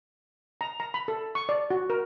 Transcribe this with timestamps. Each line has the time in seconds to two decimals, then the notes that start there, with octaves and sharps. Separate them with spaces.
0.61 A#5
0.80 A#5
0.94 B5
1.08 A4
1.35 C#6
1.49 D5
1.70 F#4
1.90 A#4